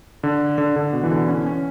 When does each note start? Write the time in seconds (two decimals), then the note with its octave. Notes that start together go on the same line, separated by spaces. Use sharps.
0.23 D3
0.58 D3
0.76 D3
0.93 B2
1.03 E3
1.11 D3
1.28 C#4
1.46 C#4